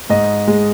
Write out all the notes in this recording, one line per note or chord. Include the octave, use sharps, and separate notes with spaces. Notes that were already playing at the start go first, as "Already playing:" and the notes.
G#2 D#5
G#3